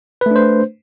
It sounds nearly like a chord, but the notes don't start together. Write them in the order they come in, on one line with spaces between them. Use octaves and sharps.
B4 A3 D4 C5